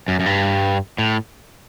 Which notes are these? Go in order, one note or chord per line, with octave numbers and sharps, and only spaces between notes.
F#2
F#2
G2
A2